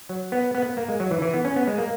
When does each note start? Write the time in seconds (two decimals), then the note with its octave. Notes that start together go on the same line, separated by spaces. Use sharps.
0.09 F#3
0.32 B3
0.55 B3
0.66 B3
0.77 A#3
0.89 G#3
1.00 F#3
1.11 E3
1.22 E3
1.34 B3
1.45 C#4
1.56 B3
1.67 G#3
1.78 A#3